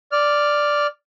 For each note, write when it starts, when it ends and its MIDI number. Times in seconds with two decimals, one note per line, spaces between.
0.12 0.87 74
0.12 0.87 89